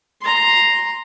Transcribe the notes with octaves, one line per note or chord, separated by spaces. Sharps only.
A#5 C6